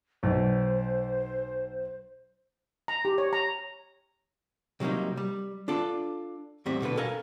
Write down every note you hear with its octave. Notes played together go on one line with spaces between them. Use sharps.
B1 C5
A#5
G4
C#5
A#5
C3 F#3 G3 A#3 D#4
G3
D4 F4 A4 D5
E2 A2 G3 C4 E5
B2 D3 A4 B4
A4 A#4 F5 G#5